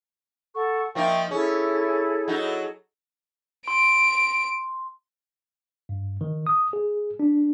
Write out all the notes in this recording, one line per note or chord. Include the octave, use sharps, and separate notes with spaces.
A4 F#5 C#6
F3 A#3 D#4 E5 G5 C#6
C#4 E4 G#4 A4
F#3 D#4
C6 D7
G2
D#3
D#6
G#4
D4